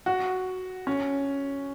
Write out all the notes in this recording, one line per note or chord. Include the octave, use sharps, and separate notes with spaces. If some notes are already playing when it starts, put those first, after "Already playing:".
F#4
C#4